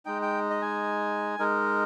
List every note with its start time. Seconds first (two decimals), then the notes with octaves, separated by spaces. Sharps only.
0.06 G#3 D#4 G5
0.22 G5
0.50 D#5
0.62 G#5
1.39 G#3 D#4 A#4